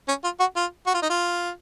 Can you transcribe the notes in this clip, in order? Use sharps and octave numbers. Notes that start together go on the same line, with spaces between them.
C#4
F4
F#4
F4
F#4
F4
D#4
F4